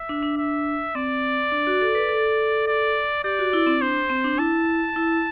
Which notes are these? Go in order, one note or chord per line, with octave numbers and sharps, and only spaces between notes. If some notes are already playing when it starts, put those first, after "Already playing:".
Already playing: E5
D4
D4
E5
C4 D5
D4
F#4
A4
B4
A4
D5
G4 D5
F#4
E4
C4
D4 C5
C4
D4
E4 A5
E4